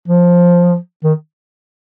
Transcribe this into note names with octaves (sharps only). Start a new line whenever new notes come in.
F3
D#3